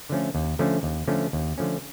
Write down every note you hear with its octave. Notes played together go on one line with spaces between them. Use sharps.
D3 F3 A3 C#4
D#2
D3 F3 A3 C#4
D#2
D3 F3 A3 C#4
D#2
D3 F3 A3 C#4